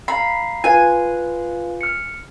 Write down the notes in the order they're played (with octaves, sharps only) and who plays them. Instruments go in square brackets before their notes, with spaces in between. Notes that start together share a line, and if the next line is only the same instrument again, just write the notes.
[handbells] F5 A#5 C7 [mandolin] B5
[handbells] F4 B4 F5 [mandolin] G#5
[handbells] F6 C#7